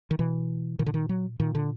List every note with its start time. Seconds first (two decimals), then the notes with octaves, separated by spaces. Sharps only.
0.11 D#3
0.19 B2 E3
0.79 A#2 D#3
0.86 D3
0.94 D#3
1.09 F#3
1.40 A#2 D#3
1.55 D3